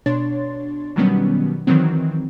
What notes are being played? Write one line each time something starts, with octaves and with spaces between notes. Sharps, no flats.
B2 D4 C#5 C6 A6
B2 D#3 F#3 G3 B3 C#4
D#3 E3 F#3 C4